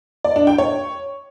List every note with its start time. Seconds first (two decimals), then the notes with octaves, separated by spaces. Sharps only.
0.25 D5
0.36 D4
0.47 G5
0.58 C#5